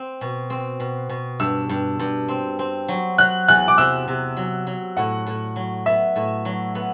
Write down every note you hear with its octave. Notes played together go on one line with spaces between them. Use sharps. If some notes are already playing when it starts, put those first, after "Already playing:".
Already playing: C4
B2
C4
B2
B2
G2 E6
G2
G2
C4
C4
F#3
F#3 F#6
E2 F#6
D6
C3 E6
C3
F#3
F#3
A2 F#5
A2
F#3
B3 E5
A2
F#3
B3